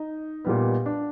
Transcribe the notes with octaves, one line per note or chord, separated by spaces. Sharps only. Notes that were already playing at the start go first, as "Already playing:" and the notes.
Already playing: D#4
A#2 G3 B3
D4